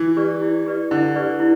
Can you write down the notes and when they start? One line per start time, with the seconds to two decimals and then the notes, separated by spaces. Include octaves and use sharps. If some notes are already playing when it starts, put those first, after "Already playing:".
Already playing: E3
0.17 G4 B4 D5
0.41 E4
0.66 G4 B4 D5
0.91 D3 E4
1.16 G4 B4 D5
1.40 E4